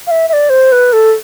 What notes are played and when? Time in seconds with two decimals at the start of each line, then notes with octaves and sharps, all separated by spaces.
0.07 F5
0.11 E5
0.29 E5
0.33 D5
0.50 C5
0.72 B4
0.93 A4